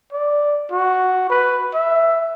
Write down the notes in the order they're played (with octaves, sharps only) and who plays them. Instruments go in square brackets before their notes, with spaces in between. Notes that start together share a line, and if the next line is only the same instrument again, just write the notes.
[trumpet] D5
F#4
B4
E5